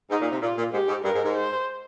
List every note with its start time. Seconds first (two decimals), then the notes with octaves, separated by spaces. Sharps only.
0.10 G#2 D#4
0.21 A#2
0.31 C3
0.41 A#2 F4
0.58 A#2
0.72 G#2 G4
0.88 G#2
1.04 G2 A#4
1.14 G#2
1.24 G#2
1.35 C5